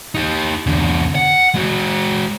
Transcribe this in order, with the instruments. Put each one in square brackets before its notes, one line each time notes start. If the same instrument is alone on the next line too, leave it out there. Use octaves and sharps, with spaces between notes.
[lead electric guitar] D#4 G4
E2 D3
F#5
G#3 F#4